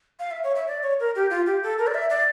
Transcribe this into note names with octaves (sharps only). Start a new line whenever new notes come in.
F5
E5
C#5
E5
D5
C#5
A#4
G4
F4
G4
A4
A#4
D5
E5
D5